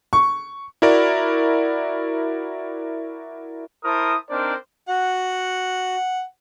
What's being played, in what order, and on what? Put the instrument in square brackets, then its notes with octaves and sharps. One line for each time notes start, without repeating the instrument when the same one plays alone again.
[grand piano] C#6
[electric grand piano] E4 F#4 A#4 D5
[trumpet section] E4 A#4 C5 A5 D#6
C4 D4 D#4 A#4 C5 D5
[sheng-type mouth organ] F#4 [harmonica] F#5